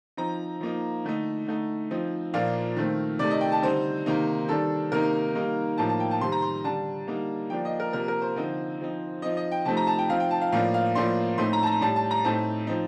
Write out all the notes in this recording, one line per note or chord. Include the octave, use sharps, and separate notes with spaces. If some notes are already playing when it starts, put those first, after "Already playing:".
F3 C4 D#4 A#5
F3 A#3 D#4
D3 A3 D#4
D3 A3 D#4
F3 C4 D#4
A#2 F3 A#3 D4 F5
D#3 A3 C4
C3 D#3 A3 D5
D#5
G5
A5
D3 G3 C4 D#4 C5
C3 D#3 A#3 D#4
D#3 G3 D4 A4
C3 D#3 A#3 D#4 A#4
D#3 G3 A#3 D#4
A2 F3 A#3 D#4 A5
A5
G5
A5
C3 D#3 G3 C4 C6
A#5
C6
D3 G3 D4 A5
D3 G3 A#3 D#4
F3 A#3 D4 G5
D#5
A#4
C3 F3 A#3 A#4
A#4
C5
D3 F3 C4 D#4
F3 C4 D#4
F3 C4 D#4 D#5
D#5
G5
C3 F3 A3 C4 D#4 A5
A#5
A5
G5
F3 C4 D#4 F5
G5
A5
F5
A2 F3 A#3 D4 F5
F5
A2 F3 A#3 D4 C6
A2 A3 C4 D#4 C6
A#5
A5
A#5
A2 G3 D4 A5
A5
A#5
A2 A3 C4 D#4 A5
F3 C4 D#4